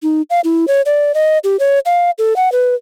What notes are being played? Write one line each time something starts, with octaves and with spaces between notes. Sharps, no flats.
D#4
F5
E4
C#5
D5
D#5
G4
C#5
F5
A4
F#5
B4